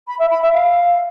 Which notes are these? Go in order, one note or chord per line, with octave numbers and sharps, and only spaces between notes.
B5
E5
B5
E5
F5